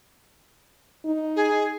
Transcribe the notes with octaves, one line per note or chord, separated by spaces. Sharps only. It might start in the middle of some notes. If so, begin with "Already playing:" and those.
D#4
G#4